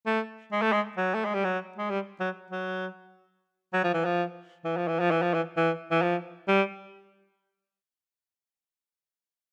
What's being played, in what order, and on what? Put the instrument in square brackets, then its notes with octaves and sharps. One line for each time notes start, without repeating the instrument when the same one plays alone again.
[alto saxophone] A3
G#3
A3
G#3
F#3
A3
G#3
G3
F#3
G#3
G3
F#3
F#3
F#3
F3
E3
F3
E3
F3
E3
F3
E3
F3
E3
E3
E3
F3
G3